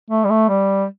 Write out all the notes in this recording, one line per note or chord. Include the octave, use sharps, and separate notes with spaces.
A3
G3
A3
G3